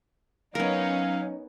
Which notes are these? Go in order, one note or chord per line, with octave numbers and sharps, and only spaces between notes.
F#3 B3 C#4 D#4 A#4 F5